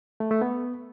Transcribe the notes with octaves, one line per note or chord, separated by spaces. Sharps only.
A3
A3
B3